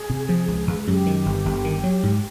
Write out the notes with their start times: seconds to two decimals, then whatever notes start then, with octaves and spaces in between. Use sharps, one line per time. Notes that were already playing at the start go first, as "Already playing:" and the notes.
Already playing: G#4
0.10 C3
0.29 F3
0.48 C#2
0.67 C#2
0.86 F#2 G4
1.06 D#3
1.26 G1
1.45 G1
1.64 D#3
1.84 F#3
2.03 G#2